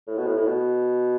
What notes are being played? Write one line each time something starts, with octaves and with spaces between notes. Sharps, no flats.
A2
B2
A2
A2
B2